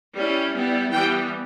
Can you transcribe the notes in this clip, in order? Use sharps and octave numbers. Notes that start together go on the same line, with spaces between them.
G3 C#4 E4
G3 B3 E4
E3 G3 B3 G5